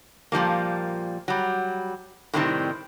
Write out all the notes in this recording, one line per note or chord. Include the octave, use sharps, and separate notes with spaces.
A#2 F3 G3 A#3
F#3 G3
A2 C3 D#3 G3 C4 D#4